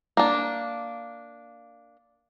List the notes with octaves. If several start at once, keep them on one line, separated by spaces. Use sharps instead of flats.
A#3 D4